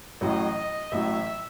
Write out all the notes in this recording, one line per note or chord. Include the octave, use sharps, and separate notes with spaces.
A1 A2 F#3 D#5
A1 A2 F#3 E5